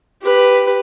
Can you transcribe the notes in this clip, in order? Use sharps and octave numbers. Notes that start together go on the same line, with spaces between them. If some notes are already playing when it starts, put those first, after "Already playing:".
G4 B4